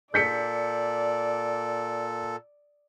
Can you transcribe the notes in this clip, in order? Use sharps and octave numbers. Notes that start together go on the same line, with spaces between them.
A#2 A4 D5 G6 B6 C#7